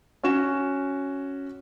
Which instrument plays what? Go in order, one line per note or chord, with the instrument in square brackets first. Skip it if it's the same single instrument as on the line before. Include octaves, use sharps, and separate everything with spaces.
[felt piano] C#4 F#4 E7